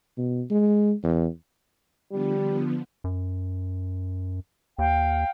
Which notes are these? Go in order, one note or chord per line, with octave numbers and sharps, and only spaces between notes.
B2
G#3
E2
D3 F3 G3 B3
F#2
D#2 F5 G5